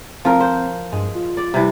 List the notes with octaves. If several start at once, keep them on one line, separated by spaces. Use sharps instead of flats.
F3 C4 A#4
C5
G2 G#3
F4
D5
C3 E3 G3